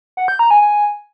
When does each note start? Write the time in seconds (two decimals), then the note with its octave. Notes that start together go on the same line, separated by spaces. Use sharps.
0.17 F#5
0.28 G6
0.39 A#5
0.50 G#5
0.62 G#5